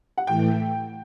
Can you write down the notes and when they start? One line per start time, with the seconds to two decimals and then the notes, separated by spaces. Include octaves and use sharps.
0.18 F#5
0.26 A2 E3 A3 G5